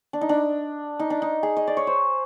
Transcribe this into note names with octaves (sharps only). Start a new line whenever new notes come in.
D4
D#4
D4
D#4
D4
D#4
G#4
D#5
D5
C#5
C5